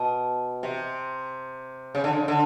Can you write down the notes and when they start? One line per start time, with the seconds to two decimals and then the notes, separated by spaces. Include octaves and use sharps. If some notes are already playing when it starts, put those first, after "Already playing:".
Already playing: B2
0.63 C3
1.95 C#3
2.04 D3
2.13 C#3
2.28 D3